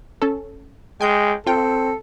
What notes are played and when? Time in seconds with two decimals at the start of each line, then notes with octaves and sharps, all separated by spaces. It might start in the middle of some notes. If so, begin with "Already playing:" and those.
0.22 C#4 A4
1.01 G#3 G5 G#5 G6
1.47 C4 F4 A4 G5